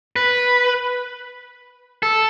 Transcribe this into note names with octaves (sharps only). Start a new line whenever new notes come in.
B4
A4